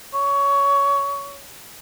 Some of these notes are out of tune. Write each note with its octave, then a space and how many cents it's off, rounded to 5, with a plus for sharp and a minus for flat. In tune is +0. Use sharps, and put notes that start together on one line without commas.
C#5 +20